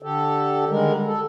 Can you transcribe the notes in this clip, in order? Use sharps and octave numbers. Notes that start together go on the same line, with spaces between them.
D3 G4 A4
D3 D#3 G3 G#3 A#4
A4